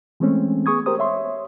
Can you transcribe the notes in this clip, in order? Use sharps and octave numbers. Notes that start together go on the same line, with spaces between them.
E3 G#3 A3 C4 C#4
B3 G#4 C#6 D#6 G#6
G4 A#4 C5 D#6
C#5 E5 C6